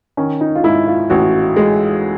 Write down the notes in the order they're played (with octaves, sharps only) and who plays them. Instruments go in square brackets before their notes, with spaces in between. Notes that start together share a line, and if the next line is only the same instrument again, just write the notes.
[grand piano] D#3 [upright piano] C#4
[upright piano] D#4
F4
[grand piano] G#2 [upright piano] E4
[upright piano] F4
[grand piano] A1 [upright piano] F#4
[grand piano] G#3